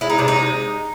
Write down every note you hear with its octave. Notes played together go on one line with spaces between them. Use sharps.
G#3 E4
D#4
C3 D4
D#4
G#3